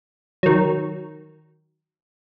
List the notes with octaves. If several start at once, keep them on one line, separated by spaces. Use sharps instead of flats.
D#3 F#3